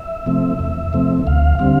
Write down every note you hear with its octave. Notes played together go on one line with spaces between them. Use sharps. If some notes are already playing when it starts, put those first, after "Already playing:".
Already playing: E5
C3 F3 A3 C4
E2
C3 F3 A3 C4
D2 F5
D3 G3 C4 F5